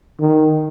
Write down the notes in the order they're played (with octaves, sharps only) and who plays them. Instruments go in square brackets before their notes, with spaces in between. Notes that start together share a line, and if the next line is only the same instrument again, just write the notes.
[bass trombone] D#3